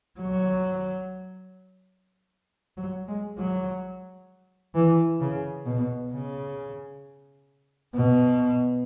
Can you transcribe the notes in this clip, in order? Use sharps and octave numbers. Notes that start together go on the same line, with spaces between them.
F#3
F#3
G#3
F#3
E3
C#3
B2
C#3
B2